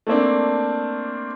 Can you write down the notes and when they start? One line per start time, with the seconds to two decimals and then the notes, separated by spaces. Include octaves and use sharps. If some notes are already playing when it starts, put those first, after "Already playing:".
0.07 A3 A#3 C4 D4